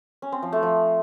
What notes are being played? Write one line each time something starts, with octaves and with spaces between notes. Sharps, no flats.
C#4
C4
F3
A3
F3